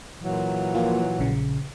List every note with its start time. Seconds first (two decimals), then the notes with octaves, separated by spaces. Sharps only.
0.21 A#2 E3 F#3
0.74 F3 A#3 F4
1.19 A#1 C#3